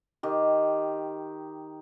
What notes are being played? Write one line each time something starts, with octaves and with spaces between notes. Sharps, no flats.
D#3 G4